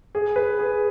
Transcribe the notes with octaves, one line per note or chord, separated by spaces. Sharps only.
G#4
B4
G#4